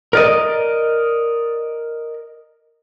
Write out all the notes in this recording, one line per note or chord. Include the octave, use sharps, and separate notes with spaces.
A#4 D5 D#5